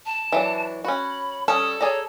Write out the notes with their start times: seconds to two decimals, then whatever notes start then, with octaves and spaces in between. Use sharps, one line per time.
0.06 A5
0.32 E3 F#3 D4
0.84 C#4 F#4 B5
1.48 G3 C#4 A4 D#6
1.81 G#4 C#5 D5 A#5